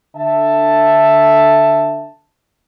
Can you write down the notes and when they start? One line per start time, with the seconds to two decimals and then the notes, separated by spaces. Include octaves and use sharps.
0.16 D3 E5 A5